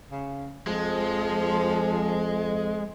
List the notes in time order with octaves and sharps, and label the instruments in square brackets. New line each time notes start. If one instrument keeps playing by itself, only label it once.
[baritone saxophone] C#3
[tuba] F2 [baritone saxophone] F3 [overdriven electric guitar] G#3